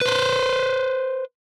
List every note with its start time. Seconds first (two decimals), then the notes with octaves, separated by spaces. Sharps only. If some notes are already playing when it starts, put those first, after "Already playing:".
0.01 B4 C5